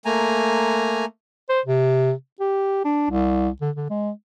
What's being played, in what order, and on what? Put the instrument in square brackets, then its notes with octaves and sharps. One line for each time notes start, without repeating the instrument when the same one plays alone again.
[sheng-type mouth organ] A3 A#3 G#5 A#5
[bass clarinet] C5
C3
G4
D4
C2
D3
D3
G#3